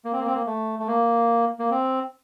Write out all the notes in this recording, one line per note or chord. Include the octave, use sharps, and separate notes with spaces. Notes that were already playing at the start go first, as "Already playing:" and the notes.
A#3
C4
A#3
C4
A#3
A3
A3
A#3
A#3
C4